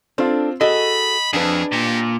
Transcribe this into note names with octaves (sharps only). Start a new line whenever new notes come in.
C4 D4 F4 A4
F#4 G#4 A4 D#5 B5
F2 D4 G#4 B4
A#2 G4